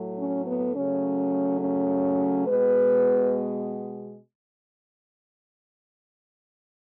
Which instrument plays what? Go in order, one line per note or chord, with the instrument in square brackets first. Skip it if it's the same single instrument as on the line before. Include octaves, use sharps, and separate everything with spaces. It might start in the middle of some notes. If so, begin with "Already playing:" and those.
Already playing: [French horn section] A2 F#3 A3
C#4
B3
C#3 F#3 A3 C#4
C#4
B2 G#3 B3 B4